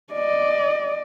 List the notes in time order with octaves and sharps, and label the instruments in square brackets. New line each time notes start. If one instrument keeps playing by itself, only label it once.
[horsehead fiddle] D5 D#5